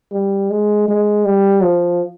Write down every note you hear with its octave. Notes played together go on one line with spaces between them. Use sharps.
G3
G#3
G#3
G3
F3